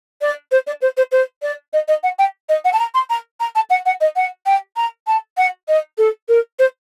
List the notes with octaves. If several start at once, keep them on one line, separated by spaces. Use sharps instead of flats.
D5
C5
D5
C5
C5
C5
D5
D#5
D#5
F#5
G5
D#5
F#5
A5
A#5
C6
A#5
A#5
A5
F#5
F#5
D#5
F#5
G5
A#5
A5
F#5
D#5
A4
A#4
C5